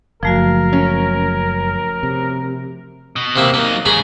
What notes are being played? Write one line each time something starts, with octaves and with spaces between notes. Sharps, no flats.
F#1 F3 A3 F#4 A#4
C#4
C3
B2
C3 A#3 E4
F#3 A#3 D#4
G#2 C#3 G#4 A#5 B5